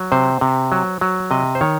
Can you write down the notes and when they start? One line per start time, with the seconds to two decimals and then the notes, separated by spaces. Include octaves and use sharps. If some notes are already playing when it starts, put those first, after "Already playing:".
Already playing: F#3
0.12 C3 C5
0.41 C3
0.72 F#3
1.01 F#3
1.31 C3 D#5
1.55 C5
1.61 D#3 C#5